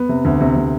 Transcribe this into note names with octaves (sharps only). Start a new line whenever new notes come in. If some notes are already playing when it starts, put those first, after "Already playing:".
Already playing: B3
C3
D2
C3
C3